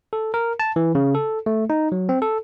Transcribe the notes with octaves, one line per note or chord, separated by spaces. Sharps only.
A4
A#4
A5
E3
C#3
A4
A3
D#4
F#3
C4
A4